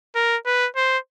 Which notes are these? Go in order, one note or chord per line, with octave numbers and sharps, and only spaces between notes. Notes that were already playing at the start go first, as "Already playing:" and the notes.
A#4
B4
C5